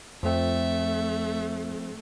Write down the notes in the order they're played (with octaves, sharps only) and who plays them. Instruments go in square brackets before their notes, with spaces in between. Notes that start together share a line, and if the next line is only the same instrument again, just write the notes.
[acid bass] F2 [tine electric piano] F3 C4 [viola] A3 [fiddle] E5